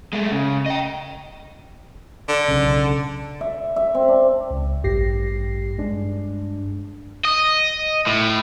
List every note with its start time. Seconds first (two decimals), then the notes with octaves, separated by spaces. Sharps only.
0.13 G#3 A3
0.31 C#3
0.66 D#5 G5
2.28 D3
2.48 B1 C#3
3.41 E5
3.76 E5
3.95 C4
4.08 D4
4.50 C#2
4.84 A1 G2 G4 A#6 C7
5.78 G2 G#3 D4
7.25 D#5
8.07 A2